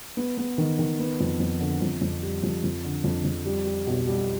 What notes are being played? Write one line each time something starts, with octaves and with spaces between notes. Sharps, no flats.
B3
B3
D#3
D#3
B3
F2
F2
D3
F2
F2
G3
F2
F2
D3
F2
F2
G3
G3
B1
G3